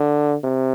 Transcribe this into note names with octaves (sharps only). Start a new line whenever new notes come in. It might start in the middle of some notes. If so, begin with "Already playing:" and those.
Already playing: D3
C3